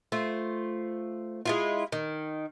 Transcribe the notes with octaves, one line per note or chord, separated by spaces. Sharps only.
A3 F4 C5
G#3 E4 F4
D#3